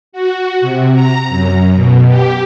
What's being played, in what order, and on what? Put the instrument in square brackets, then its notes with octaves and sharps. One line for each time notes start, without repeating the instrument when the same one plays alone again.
[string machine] F#4
C3
A#5
F#2
B2
G4